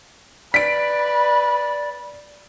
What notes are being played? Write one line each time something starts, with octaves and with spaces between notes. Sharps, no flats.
B4 D5 B6 D7